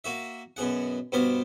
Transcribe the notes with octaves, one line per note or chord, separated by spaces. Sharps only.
A#3 F#4 E5
F#2 B2 G#4 F#5
G2 B2 B3 C5 F5 D6